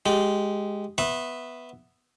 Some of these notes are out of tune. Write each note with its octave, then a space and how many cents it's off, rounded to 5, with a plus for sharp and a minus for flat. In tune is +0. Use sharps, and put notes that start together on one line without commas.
G#3 +0 G4 -15
B3 +0 E5 +0 C6 +45